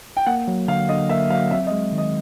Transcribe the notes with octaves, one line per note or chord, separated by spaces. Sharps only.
G5
A#3 F#5
F#3
D3 F5
D3 D#5
A#3 E5
F#3 F5
C4 E5
D#5
G#3
D#3
D#5